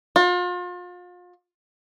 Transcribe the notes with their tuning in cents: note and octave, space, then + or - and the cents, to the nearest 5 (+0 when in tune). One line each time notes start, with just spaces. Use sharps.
F4 +35